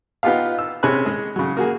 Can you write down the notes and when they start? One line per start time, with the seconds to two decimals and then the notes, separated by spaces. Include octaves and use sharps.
0.23 B3 D#4 F4 G4 F5
0.59 E6
0.83 C3 C#4 G#4 G#5 B5 F#6
1.05 G#3 G#4
1.36 C#3 F#3
1.57 A#3 F#4 G#4